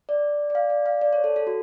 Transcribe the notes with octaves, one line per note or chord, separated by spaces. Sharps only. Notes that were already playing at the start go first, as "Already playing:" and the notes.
D5
D5
F5
D5
F5
D5
C#5
A4
A4
F#4